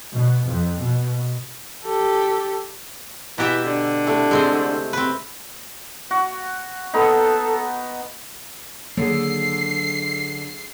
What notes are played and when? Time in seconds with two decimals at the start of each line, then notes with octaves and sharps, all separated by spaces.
0.12 B2
0.45 F2
0.78 B2
1.85 G4 A4
3.38 B2 E3 G4 E5 A#5
3.66 D3
4.06 C3 A3 E4
4.31 G#3 C4 C5 E5
4.93 C4 B4
6.11 F#4
6.94 B3 D#4 A4
8.97 D3 D#3 F#3 A#3 G#4 C7